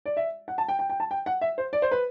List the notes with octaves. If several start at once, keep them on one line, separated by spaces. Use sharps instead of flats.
D5
E5
F#5
A5
G5
G5
G5
A5
G5
F#5
E5
C5
D5
C5
B4